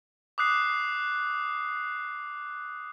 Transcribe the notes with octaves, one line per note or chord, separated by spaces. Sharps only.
D6 D#6 F#6 C7